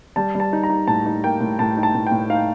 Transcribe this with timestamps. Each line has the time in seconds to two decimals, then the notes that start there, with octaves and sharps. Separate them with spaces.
0.16 G3 A5
0.35 G3 A5
0.53 D#4
0.63 A#5
0.70 D#4
0.87 A2 A5
1.06 D#4
1.24 A#3 G5
1.41 A2
1.59 A2 A5
1.77 D#4
1.83 A5
1.95 A2
2.07 G5
2.12 A2
2.30 D#4 F5